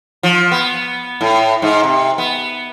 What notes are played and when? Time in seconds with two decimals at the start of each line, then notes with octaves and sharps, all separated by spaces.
0.23 F3
0.51 B3
1.21 A2
1.62 G#2
1.83 C3
2.18 B3